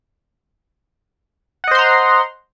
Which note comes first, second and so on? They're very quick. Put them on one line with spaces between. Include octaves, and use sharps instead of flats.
F#5 D#5 C5 C6 A#5